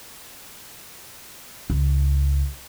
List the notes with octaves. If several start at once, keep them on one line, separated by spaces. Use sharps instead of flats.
C#2